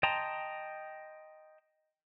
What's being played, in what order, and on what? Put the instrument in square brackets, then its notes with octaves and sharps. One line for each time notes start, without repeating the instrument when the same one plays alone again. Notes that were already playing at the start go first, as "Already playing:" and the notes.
[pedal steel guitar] D#5 G5 A5 A#5 C6